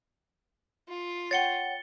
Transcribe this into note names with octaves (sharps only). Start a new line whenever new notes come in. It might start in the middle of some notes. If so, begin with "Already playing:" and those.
F4
C#5 F#5 G5 A6 C#7 G7